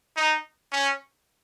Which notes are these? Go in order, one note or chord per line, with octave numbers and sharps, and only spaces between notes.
D#4
C#4